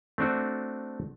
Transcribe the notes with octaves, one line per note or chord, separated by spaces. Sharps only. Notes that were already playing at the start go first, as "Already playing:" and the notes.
A3 C4 D4 F#4